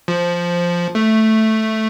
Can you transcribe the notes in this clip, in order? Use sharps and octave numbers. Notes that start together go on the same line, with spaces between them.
F3
A3